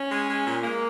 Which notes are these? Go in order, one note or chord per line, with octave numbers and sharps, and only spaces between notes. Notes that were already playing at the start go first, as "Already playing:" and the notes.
Already playing: C#4
G#3
G#3
A#2
G#3 A#3